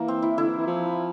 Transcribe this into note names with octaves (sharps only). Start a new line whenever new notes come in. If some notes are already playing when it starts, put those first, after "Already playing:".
Already playing: E3 A#3
C4
E4
D3 E4
E3
E3
F3